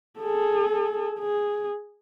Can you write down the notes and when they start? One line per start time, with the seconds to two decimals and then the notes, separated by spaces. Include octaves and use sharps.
0.20 G#4 A4
1.19 G#4